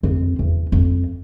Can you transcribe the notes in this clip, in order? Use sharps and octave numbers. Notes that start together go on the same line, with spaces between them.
F2 C4
E2
F2